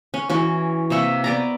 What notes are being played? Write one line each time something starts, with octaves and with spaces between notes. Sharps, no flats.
C#4
E3 C#4 F#4
C3 A#3 E5 C#6
B3 D5 A#5